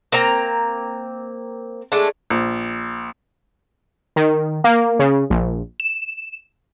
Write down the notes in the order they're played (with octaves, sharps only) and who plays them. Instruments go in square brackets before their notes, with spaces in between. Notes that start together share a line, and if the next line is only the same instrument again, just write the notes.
[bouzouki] A#3 C4 A#5
G#3 A3 D4
[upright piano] A#1
[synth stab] D#3
A#3
C#3
A#1
E7